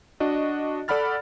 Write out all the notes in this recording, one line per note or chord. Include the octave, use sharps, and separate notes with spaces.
D4 F#4 D#5
A4 D5 F#5 B5 F6 A6